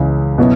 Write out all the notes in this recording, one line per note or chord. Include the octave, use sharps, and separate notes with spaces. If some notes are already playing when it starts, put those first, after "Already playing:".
Already playing: C#2 C#3 E3
B2 F#3 B3 E4